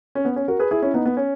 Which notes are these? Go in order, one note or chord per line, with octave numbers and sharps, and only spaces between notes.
C#4
B3
C#4
F#4 A#4
G#4 B4
E4 G#4
C#4 E4
B3 D#4
B3
C#4